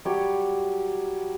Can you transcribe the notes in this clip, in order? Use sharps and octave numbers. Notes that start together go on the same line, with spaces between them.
F#3 G3 G4 C#5